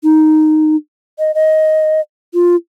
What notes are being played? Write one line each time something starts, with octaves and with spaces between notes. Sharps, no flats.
D#4
D#5
D#5
F4